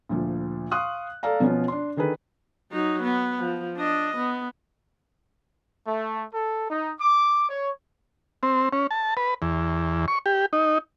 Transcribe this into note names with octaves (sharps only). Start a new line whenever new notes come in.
D2 A#2 F3
F5 C6 C#6 D#6 F#6
A4 D5 F5 A#5
B2 F3 B3 C#4 F4
D4 C6
D3 D#3 G#4 A4 B4
F#3 D#4
B3
F3
D4 D#5
B3
A3
A4
D#4
D6
C#5
C4
C#4
A5
B4
E2
C#6
G4
D#4